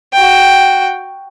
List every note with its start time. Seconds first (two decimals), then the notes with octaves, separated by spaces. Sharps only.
0.13 F#4 G5